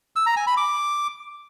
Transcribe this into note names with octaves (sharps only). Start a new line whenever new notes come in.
E6
A#5
G#5
B5
D6